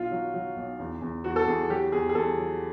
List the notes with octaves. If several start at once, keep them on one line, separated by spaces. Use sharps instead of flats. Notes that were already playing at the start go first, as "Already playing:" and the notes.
Already playing: B1 F4
F#3
F#3
B1
E2
E2
E2 F#4
A4
E2 G#4
F#3 G4
E2 G#4
G#4
E2 A4
F#3